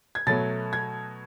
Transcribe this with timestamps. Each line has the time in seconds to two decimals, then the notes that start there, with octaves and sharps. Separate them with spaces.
0.15 G#6
0.27 B2 F#3 A3 A6
0.73 G#6